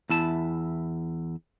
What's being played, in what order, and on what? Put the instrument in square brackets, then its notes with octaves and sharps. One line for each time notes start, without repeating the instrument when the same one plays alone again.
[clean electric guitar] E2 E4 A5